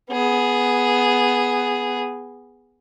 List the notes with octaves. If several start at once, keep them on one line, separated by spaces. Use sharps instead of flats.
B3 G#4